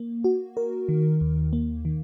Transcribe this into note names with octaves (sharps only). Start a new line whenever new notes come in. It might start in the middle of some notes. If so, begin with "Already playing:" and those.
Already playing: A#3
F#4
A#4
D#3
D#2
A#3
D#3